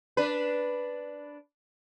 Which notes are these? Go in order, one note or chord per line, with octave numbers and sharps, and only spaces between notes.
D4 B4